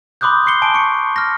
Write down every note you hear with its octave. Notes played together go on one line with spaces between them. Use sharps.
B5 C6 D6 D#6 F#6 G6
C6 C7 C#7 G7
G#5 A5 D7
C#6 C#7
F6 A#6